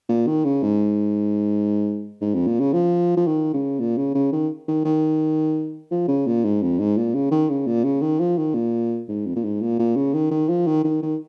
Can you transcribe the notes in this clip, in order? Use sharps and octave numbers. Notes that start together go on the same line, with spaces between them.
A#2
D#3
C#3
G#2
G#2
F2
A#2
C#3
F3
F3
D#3
C#3
A#2
C#3
C#3
D#3
D#3
D#3
F3
C#3
A#2
G#2
F2
G#2
A#2
C#3
D#3
C#3
A#2
C#3
D#3
F3
D#3
A#2
G#2
F2
A#2
G#2
A#2
A#2
C#3
D#3
D#3
F3
D#3
D#3
D#3